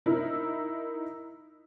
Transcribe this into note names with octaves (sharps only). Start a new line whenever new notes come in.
D#4 E4 A#4